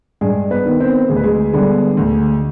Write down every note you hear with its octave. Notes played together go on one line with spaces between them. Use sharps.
G2 G#3 G#4
B3 B4
D#3 B3
C4 C5
D2 G#4
B4
G#3 G#4
D3 G3 B3
D2